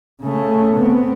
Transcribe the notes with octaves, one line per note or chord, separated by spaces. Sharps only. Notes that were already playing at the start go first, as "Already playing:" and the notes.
C#3 A3
B3 C4